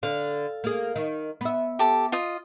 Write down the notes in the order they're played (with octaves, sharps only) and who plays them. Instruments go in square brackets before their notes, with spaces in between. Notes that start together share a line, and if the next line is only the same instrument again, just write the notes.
[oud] D3 [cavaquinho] F5
[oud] A#3 G#4
D#3
B3 E5
[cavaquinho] G4 A4
F4 D#5